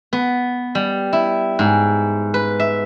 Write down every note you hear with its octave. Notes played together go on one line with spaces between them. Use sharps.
B3
G3
E4
G#2
B4
E5